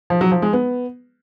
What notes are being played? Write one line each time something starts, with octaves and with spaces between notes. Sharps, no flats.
F3
F#3
F3
G#3
B3